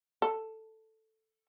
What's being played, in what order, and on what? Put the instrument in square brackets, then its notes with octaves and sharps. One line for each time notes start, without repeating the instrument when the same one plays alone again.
[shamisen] A4